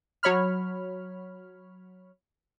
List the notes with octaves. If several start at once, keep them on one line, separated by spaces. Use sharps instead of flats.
F#3 C#5 B5 F6